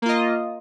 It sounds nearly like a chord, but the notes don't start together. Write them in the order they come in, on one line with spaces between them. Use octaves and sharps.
A#3 F4 D#5